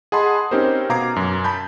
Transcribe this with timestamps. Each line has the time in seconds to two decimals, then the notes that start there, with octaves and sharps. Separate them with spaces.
0.12 G#4 D#5 F#5 A5 B5 C6
0.51 C4 C#4 D#4 G4 A#4 C5
0.89 B2 F5 A#5 D6 G#6 C7
1.16 F#2
1.44 A5 B5 G6